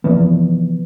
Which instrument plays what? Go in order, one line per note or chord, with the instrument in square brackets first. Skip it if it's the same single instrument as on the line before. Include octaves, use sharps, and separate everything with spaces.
[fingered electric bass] C3 E3 F3 B3